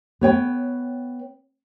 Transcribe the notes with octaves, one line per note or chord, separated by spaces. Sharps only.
B3 C#5 G5